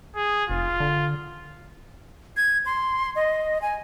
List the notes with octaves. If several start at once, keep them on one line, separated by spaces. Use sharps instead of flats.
G#4
F1 F4
D3
G#6
C6
D#5
G#5